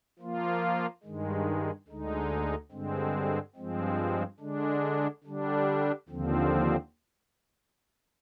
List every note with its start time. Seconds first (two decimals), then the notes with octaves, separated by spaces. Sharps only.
0.19 F3 A#3 F4
1.03 G2 D#3 G#3
1.88 D2 D3 G#3 D#4
2.71 G2 D3 G#3 C4
3.56 G2 F3 G#3 C4
4.40 D3 G#3 D4
5.24 D3 G3 D4
6.09 D#2 D3 F3 C4